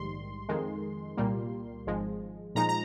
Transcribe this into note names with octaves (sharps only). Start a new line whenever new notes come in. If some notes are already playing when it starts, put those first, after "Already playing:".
Already playing: A#1 G#2 D#3 G3 C6
F2 D#3 G#3
C2 A#2 G3 A#3
G#1 G#2 F3 G#3
A#2 F3 G#3 D#4 A#5
A#5